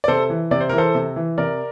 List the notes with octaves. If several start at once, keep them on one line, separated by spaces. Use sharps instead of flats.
D5
C3 A4 C5
E3
C3 D5
C5
E3 A#4
A4 C5
C3
E3
C3 A#4 D5